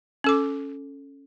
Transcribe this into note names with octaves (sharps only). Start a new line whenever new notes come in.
C#4 A4 D6